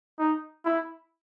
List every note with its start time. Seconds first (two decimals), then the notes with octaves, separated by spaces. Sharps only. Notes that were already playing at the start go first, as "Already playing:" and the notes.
0.19 D#4
0.65 E4